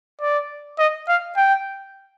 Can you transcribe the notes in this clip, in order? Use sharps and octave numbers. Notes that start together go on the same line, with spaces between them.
D5
D#5
F5
G5